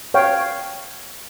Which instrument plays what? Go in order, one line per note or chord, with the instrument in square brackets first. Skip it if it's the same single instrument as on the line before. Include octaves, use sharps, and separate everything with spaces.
[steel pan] C#5 F5 G5